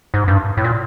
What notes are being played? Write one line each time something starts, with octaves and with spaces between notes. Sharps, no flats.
G#2
G2
A2
A#2